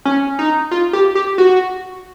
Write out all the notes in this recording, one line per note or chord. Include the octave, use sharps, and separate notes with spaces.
C#4
D#4
F4
G4
G4
F#4